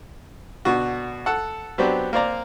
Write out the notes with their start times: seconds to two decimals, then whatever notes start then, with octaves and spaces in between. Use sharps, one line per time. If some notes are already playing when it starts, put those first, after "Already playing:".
0.65 B2 D3 F#4
1.26 A4 F#5
1.78 F#3 B3 C4 D4 G4
2.13 A#3 C4 D5 A#5